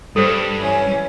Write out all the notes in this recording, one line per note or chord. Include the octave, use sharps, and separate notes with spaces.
G2 A4 C5
E3 C#4